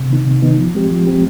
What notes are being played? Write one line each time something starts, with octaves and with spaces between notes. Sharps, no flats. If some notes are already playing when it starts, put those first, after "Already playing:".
Already playing: C3
D#3 B3 D#4
C3
D#3 B3 D#4
F3
G#3 C4 G4
F3
G#3 C4 G4